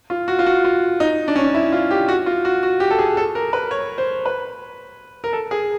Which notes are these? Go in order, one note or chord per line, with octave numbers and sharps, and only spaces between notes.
F4
F#4
F4
F#4
F4
D#4
D4
C#4
D4
E4
F4
G4
F#4
F4
F#4
F#4
G4
A4
G#4
A4
A#4
B4
C#5
C5
B4
A#4
A4
G#4